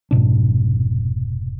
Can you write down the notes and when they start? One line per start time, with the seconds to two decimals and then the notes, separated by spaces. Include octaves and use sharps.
0.11 F1 G#2 B2 D4